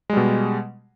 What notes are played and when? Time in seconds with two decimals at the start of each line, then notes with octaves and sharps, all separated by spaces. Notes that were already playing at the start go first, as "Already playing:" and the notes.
0.10 G#3
0.13 G3
0.17 B2